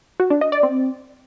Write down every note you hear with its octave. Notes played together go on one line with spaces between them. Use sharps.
F#4
D4
D#5
D5
C4